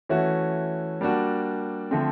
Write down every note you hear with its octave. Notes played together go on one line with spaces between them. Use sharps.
E3 A3 C#4 F#4
G3 A#3 D4 F#4
D3 F3 A3 C4